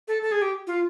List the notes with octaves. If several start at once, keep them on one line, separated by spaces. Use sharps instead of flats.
A4
A4
G#4
G4
F4